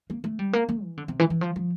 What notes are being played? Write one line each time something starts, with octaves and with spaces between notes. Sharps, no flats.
A#3
A3
G3
A#3
A#3
E3
D3
C3
E3
E3
F3
F3